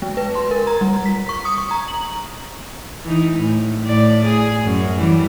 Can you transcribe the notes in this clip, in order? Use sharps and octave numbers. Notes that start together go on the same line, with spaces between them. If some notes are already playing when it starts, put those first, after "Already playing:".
G#3
B4
C6
A#4
A#5
G3
B6
C#6
D#6
C#6
A#5
F#7
E3 D#4
A2
A2 D5
G#4
F#2
E3 G3